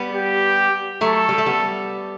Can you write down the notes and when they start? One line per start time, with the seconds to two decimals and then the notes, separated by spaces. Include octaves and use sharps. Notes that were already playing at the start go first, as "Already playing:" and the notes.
Already playing: G3 B3
0.11 G4
1.01 F#3 A3 A4
1.29 G3
1.38 A3
1.46 G3 B3